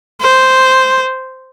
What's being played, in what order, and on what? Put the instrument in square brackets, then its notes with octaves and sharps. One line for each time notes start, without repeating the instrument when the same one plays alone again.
[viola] C5